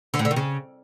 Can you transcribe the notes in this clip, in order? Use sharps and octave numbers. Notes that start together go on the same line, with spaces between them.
D3
A2
D3
D#3
C#3